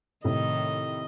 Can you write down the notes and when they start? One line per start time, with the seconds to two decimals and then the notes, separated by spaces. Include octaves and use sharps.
0.24 A2 C3 D#3 D#5